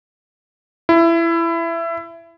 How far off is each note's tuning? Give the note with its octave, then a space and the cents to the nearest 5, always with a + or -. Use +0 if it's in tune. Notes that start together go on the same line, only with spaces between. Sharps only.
E4 +20